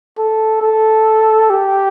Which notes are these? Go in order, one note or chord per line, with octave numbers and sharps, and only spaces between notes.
A4
A4
G4